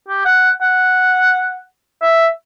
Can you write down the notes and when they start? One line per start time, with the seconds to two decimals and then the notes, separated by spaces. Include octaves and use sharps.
0.08 G4
0.25 F#5
0.62 F#5
2.02 E5